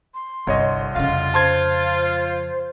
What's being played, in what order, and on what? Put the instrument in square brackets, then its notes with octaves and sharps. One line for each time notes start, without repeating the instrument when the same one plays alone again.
[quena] C6
[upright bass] G1 [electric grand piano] C2 C#5 D#5
[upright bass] F2 C#3 [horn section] F4 [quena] F5
[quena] C5 [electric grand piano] A5 C6 G#6